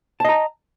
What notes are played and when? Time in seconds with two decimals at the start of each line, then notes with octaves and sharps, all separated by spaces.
0.20 A5
0.25 D#5
0.29 A#5